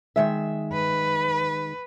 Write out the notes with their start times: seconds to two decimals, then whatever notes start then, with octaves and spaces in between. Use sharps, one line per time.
0.16 D#3 G#3 E5
0.74 B4